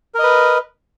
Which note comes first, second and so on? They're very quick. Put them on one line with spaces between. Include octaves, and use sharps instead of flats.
A#4 D#5 B4